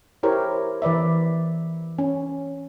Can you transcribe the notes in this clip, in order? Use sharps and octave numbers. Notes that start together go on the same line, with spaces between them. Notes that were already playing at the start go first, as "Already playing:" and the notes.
E4 G4 A#4 C5 C#5
E3 B4 D5 E5
C#4